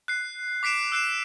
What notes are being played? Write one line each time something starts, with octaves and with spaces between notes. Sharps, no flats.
F#6 C7
D6 B6 C7 D7 E7
E6 F#6 C7 E7